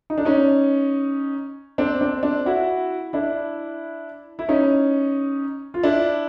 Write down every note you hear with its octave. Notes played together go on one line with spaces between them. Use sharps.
D#4
D4
C#4 D#4
C4 D4
C4 D4
C4 D4
E4 F#4
D4 E4
E4
C#4 D#4
F4
D4 E4